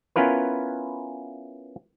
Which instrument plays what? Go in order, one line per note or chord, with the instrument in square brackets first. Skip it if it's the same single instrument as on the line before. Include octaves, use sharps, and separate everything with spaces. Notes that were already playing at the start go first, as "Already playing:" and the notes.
[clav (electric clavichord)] B3 C#4 E4 F4 A#4 B4